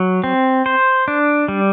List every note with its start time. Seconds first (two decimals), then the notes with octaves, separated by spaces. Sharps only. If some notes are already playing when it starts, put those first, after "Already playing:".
Already playing: F#3
0.24 C4
0.66 C5
1.08 D4
1.48 G3